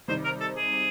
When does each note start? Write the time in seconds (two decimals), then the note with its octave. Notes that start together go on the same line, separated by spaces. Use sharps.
0.08 C3 D#3 G3 C4 D#4 C5
0.24 A#4
0.41 A4
0.57 G#4